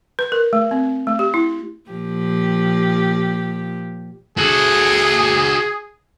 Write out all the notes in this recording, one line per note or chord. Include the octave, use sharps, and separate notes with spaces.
B4
A#4
A3
C4
A3
G4
E4
A#2 F3 G4
F#4 G#4 A4